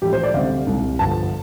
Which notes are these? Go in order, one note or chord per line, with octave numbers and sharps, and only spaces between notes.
A1 A2 F3 G4
C5
D5
D2 C3 G3 F5
C2 C3 G3
G1 G2 D3 F3 A5